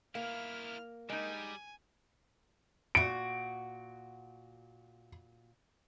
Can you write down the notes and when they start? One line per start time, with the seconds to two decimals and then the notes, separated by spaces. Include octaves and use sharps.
0.15 A#3 E4 A#4 F5 F6
1.09 G3 G#3 D#4 G#5
2.95 A#2 F#4 D7